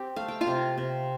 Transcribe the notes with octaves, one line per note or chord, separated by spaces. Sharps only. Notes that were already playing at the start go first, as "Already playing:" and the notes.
Already playing: C4 G4 G5
A3 F5
G5
F4 F5
C3
C3